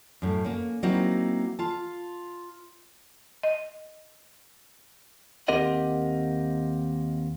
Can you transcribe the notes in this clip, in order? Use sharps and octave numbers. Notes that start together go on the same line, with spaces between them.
F#2 A2
A#3 C#4
F#3 A#3 C4 D#4 E4 F#4
F4 A5
D#5
D#2 C4 G4 A#4 D#5 F#5